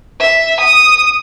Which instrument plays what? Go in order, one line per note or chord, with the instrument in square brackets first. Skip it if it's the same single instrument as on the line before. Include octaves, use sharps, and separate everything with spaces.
[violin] E5
D#6